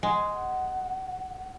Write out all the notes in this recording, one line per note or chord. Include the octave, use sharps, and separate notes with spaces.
G#3 F#5